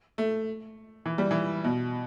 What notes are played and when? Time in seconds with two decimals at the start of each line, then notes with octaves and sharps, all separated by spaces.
0.18 A3
1.06 E3
1.18 G3
1.31 E3
1.64 B2